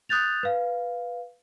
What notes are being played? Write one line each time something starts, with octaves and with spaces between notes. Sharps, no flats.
D#6 F#6 G6 A6 F7
B4 F5